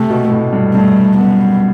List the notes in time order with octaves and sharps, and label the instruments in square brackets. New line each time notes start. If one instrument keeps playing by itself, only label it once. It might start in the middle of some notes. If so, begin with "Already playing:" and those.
Already playing: [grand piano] C3 [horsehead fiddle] A3
[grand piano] B2
A2
G2
[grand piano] G2 [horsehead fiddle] A3
[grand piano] F#2 [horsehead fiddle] B3